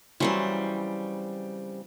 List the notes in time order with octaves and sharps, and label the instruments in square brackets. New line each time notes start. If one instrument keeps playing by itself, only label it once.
[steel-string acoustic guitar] C#3 G3 C4 [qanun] E3 F#3 C5